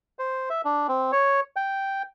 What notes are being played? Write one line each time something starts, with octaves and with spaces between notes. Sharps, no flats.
C5
E5
D4
C4
C#5
G5